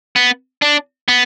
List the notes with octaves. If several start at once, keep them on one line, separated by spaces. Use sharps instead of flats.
B3
D4
B3